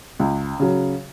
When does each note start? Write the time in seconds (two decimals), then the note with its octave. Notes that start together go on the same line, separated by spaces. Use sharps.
0.19 C#2
0.60 C#3 F#3